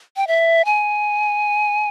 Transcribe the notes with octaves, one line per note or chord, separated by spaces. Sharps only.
G5
E5
G#5